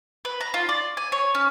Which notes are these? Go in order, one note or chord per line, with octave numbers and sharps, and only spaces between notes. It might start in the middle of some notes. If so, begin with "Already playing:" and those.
B4
A#5
F4
D5
G#5
C#5
C#4